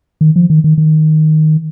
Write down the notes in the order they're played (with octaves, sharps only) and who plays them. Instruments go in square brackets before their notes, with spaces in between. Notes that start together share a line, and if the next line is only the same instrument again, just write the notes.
[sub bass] D#3
F3
D#3
D#3
D#3